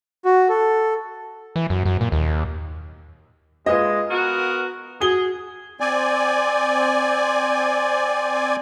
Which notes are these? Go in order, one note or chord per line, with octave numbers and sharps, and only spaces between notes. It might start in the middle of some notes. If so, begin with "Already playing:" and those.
F#4
A4
E3
F#2
F#2
A#2
D#2
G#3 F4 B4 D#5
B3 F#4 A#4
F#4 G#4 G7
C4 D5 G#5